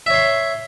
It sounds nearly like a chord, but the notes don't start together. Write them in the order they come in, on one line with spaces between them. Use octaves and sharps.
E5 C#5 C6